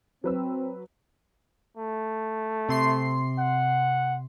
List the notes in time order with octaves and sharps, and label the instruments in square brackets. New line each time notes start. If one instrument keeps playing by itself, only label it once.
[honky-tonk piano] F#3 B4 E6 [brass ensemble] C4
[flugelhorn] A3
[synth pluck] C3 C6 C7
[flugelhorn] F#5